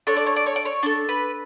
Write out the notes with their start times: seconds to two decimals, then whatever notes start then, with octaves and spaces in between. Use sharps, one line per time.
0.07 D4 A4 C#5
0.17 D5
0.27 C#5
0.36 D5
0.46 C#5
0.56 D5
0.65 C#5
0.83 D4 A4
1.09 B4